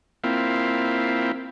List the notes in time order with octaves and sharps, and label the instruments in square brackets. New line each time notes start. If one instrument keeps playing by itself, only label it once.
[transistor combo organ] A#3 C4 E4 F4